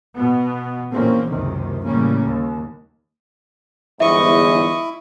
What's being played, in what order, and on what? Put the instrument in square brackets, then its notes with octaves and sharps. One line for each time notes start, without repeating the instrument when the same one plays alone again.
[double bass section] B2 B3
A#1 E2 A#3 C4 C#4
F#1 C#2 F#2 C3 D#3
A1 C#3 G3 A#3 C#4
D#2
[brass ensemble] G1 E2 G#2 [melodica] E4 [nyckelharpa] D#5 C#6 [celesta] E5